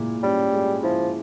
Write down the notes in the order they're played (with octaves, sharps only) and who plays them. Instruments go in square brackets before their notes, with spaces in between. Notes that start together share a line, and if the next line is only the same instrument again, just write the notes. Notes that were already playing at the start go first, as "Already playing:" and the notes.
Already playing: [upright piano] A#2 G#3 E4
[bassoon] G3 [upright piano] C#4
[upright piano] G#3
[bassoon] F3 [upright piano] E4